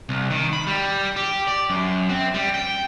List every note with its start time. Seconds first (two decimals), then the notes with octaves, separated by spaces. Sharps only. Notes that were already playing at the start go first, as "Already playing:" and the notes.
0.09 C2
0.30 D#3
0.53 B5
0.67 G3
1.16 G4
1.47 D5
1.70 F#2
2.09 C4
2.34 G3
2.54 G5